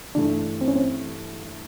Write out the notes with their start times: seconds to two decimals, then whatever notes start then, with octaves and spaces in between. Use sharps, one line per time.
0.15 G2 E3 A3 D4
0.61 C4
0.68 C#4
0.76 C4